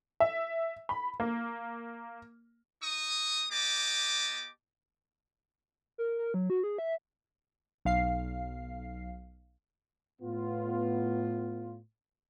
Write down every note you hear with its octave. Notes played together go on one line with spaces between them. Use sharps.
E5
B5
A#3
D#4 C#6 D#6
B3 G4 D#5 A5 D6
A#4
A#4
F#3
F#4
G#4
E5
B1 F5 C7
A2 B3 F4